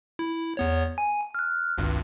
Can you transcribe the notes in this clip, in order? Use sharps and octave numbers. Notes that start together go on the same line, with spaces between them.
E4
E2 B3 C#5
G#5
F6 F#6
G#1 C#2 G2